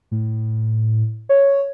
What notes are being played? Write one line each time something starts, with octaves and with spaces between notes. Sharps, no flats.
A2
C#5